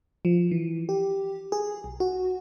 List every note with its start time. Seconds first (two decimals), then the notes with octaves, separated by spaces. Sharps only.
0.25 F3
0.52 E3
0.89 G4
1.52 G#4
1.84 B1
2.00 F#4